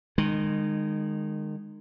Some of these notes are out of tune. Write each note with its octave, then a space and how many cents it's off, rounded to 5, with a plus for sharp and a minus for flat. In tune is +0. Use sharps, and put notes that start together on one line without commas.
D#3 -25 G#3 -15